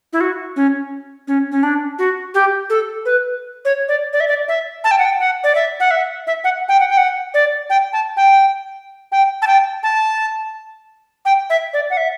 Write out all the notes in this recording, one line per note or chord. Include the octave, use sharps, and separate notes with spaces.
E4
F#4
C#4
C#4
C#4
D4
F#4
G4
A4
B4
C#5
D5
D5
E5
D5
E5
A5
G5
F#5
G5
F#5
D5
E5
F#5
E5
E5
F#5
G5
F#5
G5
F#5
D5
G5
A5
G5
G5
A5
G5
A5
G5
E5
D5
F#5
E5